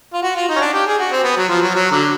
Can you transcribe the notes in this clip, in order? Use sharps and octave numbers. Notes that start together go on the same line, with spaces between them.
F4
F#4
F4
D#4
C#4
D4
G4
G#4
F#4
C4
B3
F#3
F3
F#3
F#3
D3